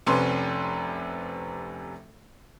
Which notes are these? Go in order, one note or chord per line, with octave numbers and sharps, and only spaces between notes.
F1 C3 C#4 B4 C6